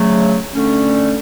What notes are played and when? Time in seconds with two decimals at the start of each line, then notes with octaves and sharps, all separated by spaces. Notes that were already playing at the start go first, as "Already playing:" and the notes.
Already playing: C#3 F#3 A3
0.54 D3 A3 C#4